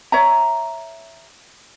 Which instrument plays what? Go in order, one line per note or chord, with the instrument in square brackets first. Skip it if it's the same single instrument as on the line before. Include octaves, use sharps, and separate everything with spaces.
[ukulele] C#5 E5 A#5